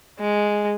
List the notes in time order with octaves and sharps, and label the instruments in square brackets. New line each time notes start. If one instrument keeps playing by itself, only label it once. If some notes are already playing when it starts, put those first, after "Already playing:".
[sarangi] G#3